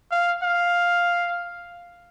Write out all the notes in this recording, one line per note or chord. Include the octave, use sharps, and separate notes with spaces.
F5
F5